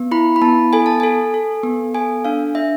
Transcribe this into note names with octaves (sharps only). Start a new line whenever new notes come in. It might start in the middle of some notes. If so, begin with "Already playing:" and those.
Already playing: B3
E4 B5
B5
B3 A5
A4 G#5
A5
A4 G#5
A4
B3
A4 G#5
D4 F5
D4 E5